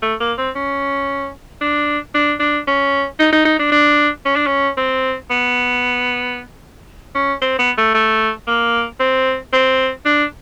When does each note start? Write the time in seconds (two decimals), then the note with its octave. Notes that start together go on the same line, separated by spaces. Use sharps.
0.02 A3
0.20 A#3
0.38 C4
0.55 C#4
1.61 D4
2.14 D4
2.40 D4
2.67 C#4
3.19 D#4
3.32 D#4
3.45 D#4
3.59 D4
3.72 D4
4.25 C#4
4.36 D4
4.46 C#4
4.77 C4
5.30 B3
7.15 C#4
7.42 C4
7.59 B3
7.77 A3
7.94 A3
8.47 A#3
9.00 C4
9.53 C4
10.05 D4